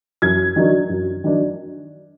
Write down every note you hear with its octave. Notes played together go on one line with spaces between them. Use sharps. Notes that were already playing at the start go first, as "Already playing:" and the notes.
F#2 G#6
D#3 F#3 D4
F#2
D#3 F#3 D4